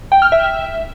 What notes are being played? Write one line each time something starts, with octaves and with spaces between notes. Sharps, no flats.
G5
F6
E5